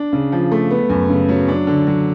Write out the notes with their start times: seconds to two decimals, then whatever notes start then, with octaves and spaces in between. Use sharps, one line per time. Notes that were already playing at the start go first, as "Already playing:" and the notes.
Already playing: D4
0.13 C#3
0.32 F3
0.52 A3
0.71 B3
0.90 F#2
1.09 C#3
1.29 F#3
1.48 D4
1.67 D3
1.87 F#3